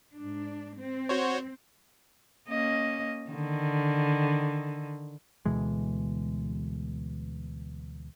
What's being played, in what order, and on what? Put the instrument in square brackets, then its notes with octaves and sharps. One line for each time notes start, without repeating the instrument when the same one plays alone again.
[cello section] G#2 D4
C4
[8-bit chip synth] F#4 C5 C#5
[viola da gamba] A#3 C#4 D#5
D3 D#3
[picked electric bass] D2 B2 E3 G#3